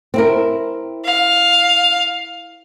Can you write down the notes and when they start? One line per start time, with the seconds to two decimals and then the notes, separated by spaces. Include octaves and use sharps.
0.14 C4 E4 A#4
1.05 F5